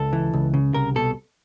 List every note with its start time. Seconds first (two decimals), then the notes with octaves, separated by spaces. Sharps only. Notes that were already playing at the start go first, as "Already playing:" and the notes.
Already playing: C#2 A4
0.13 E3
0.33 C#2
0.54 C#3
0.74 C2 A#4
0.96 B2 A4